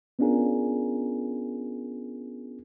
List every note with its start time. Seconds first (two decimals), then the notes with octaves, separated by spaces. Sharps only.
0.19 B3 C#4 D4 F4 G#4 A#4